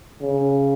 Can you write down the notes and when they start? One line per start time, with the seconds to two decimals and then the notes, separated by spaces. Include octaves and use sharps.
0.22 C#3